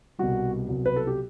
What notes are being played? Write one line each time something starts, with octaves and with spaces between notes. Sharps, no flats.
C2 B2 G3 F#4
C2 B2 F#3
B4
A4
G4